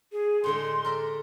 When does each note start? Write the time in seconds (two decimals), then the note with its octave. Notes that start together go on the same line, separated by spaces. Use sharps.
0.12 G#4
0.44 A2 D3 G#3 C6
0.84 A#4 D5 E5